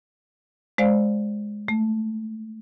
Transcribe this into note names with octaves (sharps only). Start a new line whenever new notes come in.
G#3 C5 D5 F5
A3